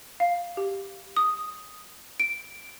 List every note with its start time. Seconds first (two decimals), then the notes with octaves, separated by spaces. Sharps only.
0.20 F5
0.57 G4
1.17 D#6
2.20 D7